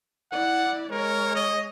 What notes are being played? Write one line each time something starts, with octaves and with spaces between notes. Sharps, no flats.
E4 D5 F#5
G#3 A#4 C#5
D#5